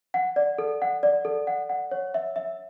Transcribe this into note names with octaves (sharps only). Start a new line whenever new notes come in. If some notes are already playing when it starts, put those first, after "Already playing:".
F#5
D5
A4
F#5
D5
A4
F#5
F#5
C#5
E5
E5